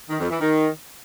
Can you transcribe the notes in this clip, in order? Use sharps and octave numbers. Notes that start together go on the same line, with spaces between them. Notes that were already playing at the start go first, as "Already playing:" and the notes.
D#3
F2
E3
D#3